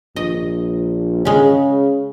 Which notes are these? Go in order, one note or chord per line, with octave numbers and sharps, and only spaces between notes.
A#1 D#5
C#3 G#3 C#4